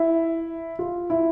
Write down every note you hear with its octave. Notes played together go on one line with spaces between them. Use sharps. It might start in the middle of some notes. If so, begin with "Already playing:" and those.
Already playing: E4
F4
E4